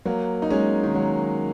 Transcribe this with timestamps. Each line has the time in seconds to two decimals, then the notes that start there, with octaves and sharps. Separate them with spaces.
0.05 F#3 A#3
0.42 D#4
0.50 G#3 C#4
0.83 D#3
0.95 F#3